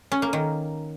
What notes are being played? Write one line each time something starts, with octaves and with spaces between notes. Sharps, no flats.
C#4
A#3
D#3